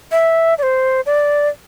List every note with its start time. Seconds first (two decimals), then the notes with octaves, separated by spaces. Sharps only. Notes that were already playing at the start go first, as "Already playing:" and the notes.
0.11 E5
0.58 D5
0.63 C5
1.06 D5